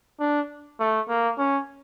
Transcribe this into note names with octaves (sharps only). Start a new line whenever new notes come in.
D4
A3
A#3
C#4